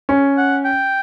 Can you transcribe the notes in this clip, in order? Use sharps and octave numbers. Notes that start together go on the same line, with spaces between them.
C#4
F#5
G5